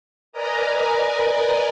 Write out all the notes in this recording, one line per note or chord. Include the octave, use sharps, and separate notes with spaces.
A#4 B4 D5 D#5 G#5 A#5